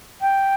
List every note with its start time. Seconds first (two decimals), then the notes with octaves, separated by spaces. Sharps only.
0.21 G5